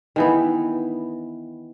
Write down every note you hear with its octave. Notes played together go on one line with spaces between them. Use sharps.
D#3 E3 B3